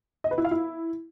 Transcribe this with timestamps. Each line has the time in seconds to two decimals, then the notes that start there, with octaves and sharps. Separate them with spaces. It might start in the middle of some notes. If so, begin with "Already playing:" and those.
0.24 D#5
0.31 B4
0.38 E4
0.45 F5
0.51 E4